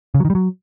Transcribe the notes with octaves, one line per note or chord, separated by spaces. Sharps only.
C#3
F#3
D#3
G3
F#3